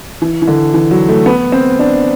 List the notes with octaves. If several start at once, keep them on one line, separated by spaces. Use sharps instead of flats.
E3
E3
D3
E3
F#3
A3
B3
C4
D4